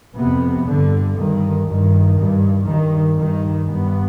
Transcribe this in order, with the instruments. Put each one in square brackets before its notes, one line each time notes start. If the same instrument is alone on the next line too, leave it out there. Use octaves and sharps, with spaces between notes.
[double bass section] F2 C3 B3
G2 D3
G2 D#3
G2 D#3
G2
G2 D#3
G2 D#3
G2 B3